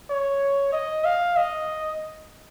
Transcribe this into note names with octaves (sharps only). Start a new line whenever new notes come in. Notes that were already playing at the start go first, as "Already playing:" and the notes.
C#5
D#5
F5
D#5